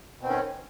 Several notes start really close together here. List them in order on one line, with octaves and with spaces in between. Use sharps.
B2 C4 D#3 C#4